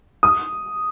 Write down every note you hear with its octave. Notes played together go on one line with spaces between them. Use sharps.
D#6